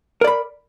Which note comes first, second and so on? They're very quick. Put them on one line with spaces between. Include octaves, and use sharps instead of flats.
A#4 D5 B5